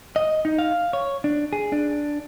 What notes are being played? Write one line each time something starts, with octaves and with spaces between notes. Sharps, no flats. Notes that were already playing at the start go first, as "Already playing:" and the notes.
D#5
D#4
F5
C#5
D4
G#4
D4